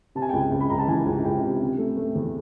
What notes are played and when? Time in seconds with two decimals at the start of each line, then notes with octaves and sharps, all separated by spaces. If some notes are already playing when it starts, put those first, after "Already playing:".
0.15 C3 A5
0.22 G#5
0.29 G5
0.33 C#2 G#5
0.51 C#2
0.61 B5
0.70 C#2 A#5
0.78 A5
0.88 E3 G#5
1.06 C#2
1.25 C#2 G5
1.43 C3
1.61 C3
1.78 A3
1.97 A3
2.15 E2